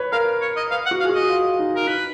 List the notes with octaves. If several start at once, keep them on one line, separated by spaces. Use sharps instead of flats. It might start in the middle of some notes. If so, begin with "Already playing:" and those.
Already playing: B4 C#5
A#4 F5
C#5
D#5
B4 F5
F#5
F#4
F5
G#4
F#4
D#5
F4
D#4
A#4
D#4 B4